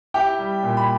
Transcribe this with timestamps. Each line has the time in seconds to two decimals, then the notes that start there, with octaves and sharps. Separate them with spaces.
0.14 E4 G4 G5
0.39 G3
0.63 A#2
0.77 B5